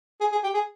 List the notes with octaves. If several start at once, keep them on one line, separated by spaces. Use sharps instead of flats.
G#4
G#4
G4
G#4